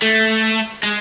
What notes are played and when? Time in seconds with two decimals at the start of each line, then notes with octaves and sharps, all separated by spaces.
0.02 A3
0.83 G#3